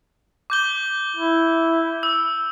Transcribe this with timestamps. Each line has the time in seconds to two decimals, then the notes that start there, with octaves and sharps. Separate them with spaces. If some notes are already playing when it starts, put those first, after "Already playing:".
0.50 D6 G6 G7
1.17 E4
2.03 E6